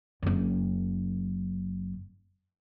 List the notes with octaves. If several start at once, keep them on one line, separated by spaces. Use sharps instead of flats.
F#1 F#2